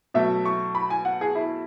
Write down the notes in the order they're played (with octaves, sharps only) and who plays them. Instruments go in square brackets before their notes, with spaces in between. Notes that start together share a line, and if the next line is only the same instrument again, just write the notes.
[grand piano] B2 F#3 A3 E5
C#6
B5
G#5
F#5
G#4
E4